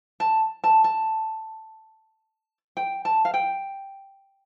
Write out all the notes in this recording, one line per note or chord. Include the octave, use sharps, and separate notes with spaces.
A5
A5
A5
G5
A5
F5
G5